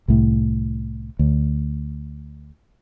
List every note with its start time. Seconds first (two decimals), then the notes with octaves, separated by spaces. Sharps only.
0.08 C2 A2
1.19 D2